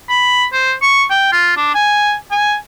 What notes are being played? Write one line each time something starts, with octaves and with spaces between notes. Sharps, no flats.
B5
C5
C#6
G5
F4
D4
G#5
G#5